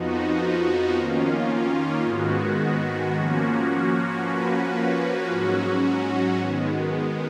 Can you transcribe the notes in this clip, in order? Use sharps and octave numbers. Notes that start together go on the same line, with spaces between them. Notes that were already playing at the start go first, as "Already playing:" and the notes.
Already playing: F2 F3 B3 D#4 F#4
D#3 A#3 C#4 F4
G#2 D#3 G#3 B3 F#4
F3 A#3 C#4 F#4
F3 A#3 C#4 F#4 B4
G#2 F#3 C#4 F#4
D#3 G#3 B3